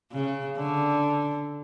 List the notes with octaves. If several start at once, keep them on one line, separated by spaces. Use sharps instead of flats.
C#3
D3